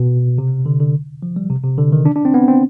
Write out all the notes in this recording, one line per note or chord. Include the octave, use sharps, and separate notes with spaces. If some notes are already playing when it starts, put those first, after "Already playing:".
Already playing: B2
C3
D3
D3
F3
G3
C3
C3
D3
D#3
D4
D4
C4
B3
C4